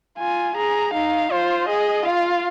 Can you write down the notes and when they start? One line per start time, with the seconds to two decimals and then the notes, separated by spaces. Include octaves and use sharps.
0.19 F4 G#5
0.56 G#4 A#5
0.94 D#4 F5
1.31 F4 C5
1.68 G#4 D#5
2.06 F4 F5